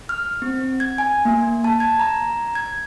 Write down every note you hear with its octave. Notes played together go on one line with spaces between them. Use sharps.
F6
C4
G#6
G#5
A#3
A5
G#6
A#5
G#6